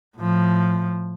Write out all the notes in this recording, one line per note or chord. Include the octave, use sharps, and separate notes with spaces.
A2 F3